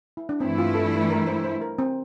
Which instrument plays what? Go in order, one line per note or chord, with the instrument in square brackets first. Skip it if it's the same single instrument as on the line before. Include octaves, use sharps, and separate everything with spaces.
[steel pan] E4
D4
[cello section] G2 E3 A3 E4 [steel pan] C4
[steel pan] F4
A4
A#4
C5
C5
A#4
C4